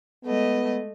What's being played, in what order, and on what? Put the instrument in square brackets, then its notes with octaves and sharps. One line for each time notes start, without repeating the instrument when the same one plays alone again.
[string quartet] G#3 A3 D#5 [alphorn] B3